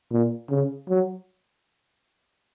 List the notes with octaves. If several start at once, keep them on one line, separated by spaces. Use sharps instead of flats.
A#2
C#3
F#3